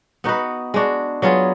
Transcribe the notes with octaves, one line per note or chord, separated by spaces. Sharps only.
B3 D#4 F#4 B4
G#3 D4 F#4
F#3 B3 F4 G#4